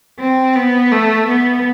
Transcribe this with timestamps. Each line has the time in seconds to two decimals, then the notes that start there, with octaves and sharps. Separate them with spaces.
0.19 C4
0.56 B3
0.92 A3
1.29 B3